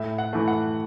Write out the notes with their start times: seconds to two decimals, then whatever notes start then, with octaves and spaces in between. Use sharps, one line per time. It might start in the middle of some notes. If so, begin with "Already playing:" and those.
Already playing: A2 E5
0.18 F#5
0.33 E3 A3
0.48 F#5